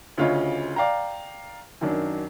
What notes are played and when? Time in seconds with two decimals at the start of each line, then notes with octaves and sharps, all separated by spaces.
0.18 D2 C#3 F4 C#5 D#5
0.76 D5 F5 G5 A#5
1.81 F#2 D#3 F#3 D4